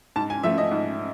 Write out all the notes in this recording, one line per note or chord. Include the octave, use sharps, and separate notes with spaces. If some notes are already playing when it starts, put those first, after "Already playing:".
G#2 A5
G#5
F3 A3 E5
D#5
G#2